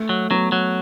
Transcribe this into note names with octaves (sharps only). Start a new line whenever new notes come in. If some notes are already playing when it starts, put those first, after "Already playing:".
Already playing: A3
F#3
F#3 B3
F#3